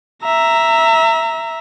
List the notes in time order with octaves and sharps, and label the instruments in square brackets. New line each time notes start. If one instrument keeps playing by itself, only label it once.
[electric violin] E5 A#5